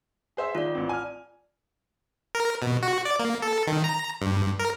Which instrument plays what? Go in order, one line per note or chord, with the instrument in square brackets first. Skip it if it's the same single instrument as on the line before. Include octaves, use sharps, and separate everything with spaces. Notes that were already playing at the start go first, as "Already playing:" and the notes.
[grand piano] G#4 C5 E5
[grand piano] D#3 [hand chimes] F4 D5
[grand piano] A1 C4
G#5 F6
[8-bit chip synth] A#4
B2
F#4
D5
A#3
A4
D#3
A#5
G2
A#4